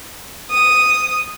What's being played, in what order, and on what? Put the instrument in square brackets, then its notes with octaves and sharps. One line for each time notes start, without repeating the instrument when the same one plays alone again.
[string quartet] D#6